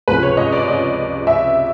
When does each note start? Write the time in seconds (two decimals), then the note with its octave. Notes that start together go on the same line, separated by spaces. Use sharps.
0.08 C#2 C3 F3 B4
0.23 C#5
0.37 D#5
0.52 D5
0.68 D#5
1.27 E5